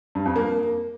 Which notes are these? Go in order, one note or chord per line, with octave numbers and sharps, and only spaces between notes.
G2
F2
A#3